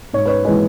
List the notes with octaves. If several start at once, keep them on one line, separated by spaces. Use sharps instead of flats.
G#2 C#5
B4
C#5
E3 G#3 B4